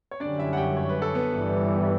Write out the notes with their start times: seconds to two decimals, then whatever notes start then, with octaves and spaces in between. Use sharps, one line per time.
0.11 C#5
0.20 F#2 D3 G3 C#4 D4 D5
0.39 E4 E5
0.53 F#5
0.57 G4 G5
0.77 C#5
0.89 B4
1.02 A4
1.14 B3 B4
1.33 G1 G2 E3 G3